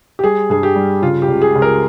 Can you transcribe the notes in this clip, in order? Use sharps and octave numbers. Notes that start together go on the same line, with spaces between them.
G4
G3 G#4
G2 G#4
G4
G3
C#3 F4
G4
C#2
G#4
C#2
A#4